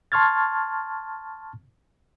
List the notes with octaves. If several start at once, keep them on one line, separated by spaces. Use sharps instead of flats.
A5 C6 C#6 F6 G#6 A6